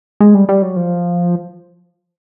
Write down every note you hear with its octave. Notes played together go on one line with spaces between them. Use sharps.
G#3
G3
G3
F#3
F3